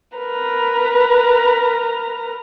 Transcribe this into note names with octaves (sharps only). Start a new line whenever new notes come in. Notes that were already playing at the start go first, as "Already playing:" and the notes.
A#4 B4 A#5